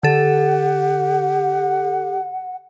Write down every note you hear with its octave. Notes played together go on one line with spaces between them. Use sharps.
D3 G4 A4 F#5